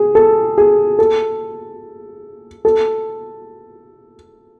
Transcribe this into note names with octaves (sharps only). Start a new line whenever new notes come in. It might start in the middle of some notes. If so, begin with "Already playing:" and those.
Already playing: G#4
A4
G#4
A4
A4